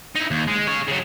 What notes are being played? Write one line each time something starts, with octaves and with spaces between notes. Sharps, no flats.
D#4 E4
D#2
G#3
G#4 C#5
C#3 F#3